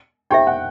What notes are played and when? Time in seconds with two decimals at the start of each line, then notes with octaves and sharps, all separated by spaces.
0.30 D#4 G4 C5 E5 G5
0.47 F#5